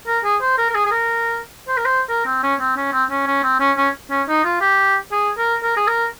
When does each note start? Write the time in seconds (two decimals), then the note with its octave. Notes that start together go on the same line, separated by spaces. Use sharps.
0.07 A#4
0.24 G#4
0.41 C5
0.58 A#4
0.70 A#4
0.74 G#4
0.86 G#4
0.91 A#4
1.68 C5
1.77 A#4
1.85 C5
2.09 A#4
2.26 C4
2.43 C#4
2.60 C4
2.76 C#4
2.92 C4
3.10 C#4
3.27 C#4
3.43 C4
3.60 C#4
3.77 C#4
4.10 C#4
4.28 D#4
4.44 F4
4.61 G4
5.12 G#4
5.38 A#4
5.63 A#4
5.77 G#4
5.87 A#4